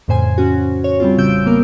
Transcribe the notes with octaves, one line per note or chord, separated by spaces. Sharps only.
F2 A2 C#3 C5 G#5
C#4 F#4
C#5
G3 C4 F4
A1 C#3 G3 E6 G6 D7
C#3 A#3 B3 A#4